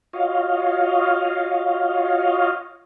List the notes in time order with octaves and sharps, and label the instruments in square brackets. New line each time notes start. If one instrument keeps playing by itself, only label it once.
[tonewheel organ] F4 F#4 C#5 D#5 F5